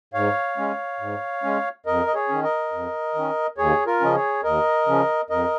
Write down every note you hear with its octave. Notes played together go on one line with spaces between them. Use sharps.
G#2 C#5 F5
G#3 C#4
G#2
G#3 C#4
F2 A#4 D#5
D#5
G#4 C#5
D#3 C#4
A#4 D#5
F2
D#3 C#4
D#2 G#4 C#5
F4 A#4
C#3 F3 C#4 D#5
G#4 C#5
D#2 A#4 D#5
C#3 F3 C#4
F2 A#4 D#5